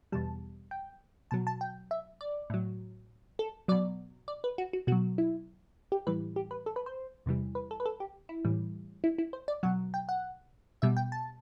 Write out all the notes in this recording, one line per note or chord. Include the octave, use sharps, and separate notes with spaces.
E2 B2 G3 A5
G5
B2 F#3 A5
A5
G5
E5
D5
A2 F#3
A4
B2 F#3 D5
D5
B4
F#4
F#4
B2 F#3 F#4
E4
G4
A2 E3 G3 B4
G4
B4
A4
B4
C5
E2 C3 E3 G3
B4
A4
B4
A4
G4
E4
A2 E3 G3
E4
E4
C5
D5
B2 F#3 F#5
G5
F#5
B2 G3 E5
G5
A5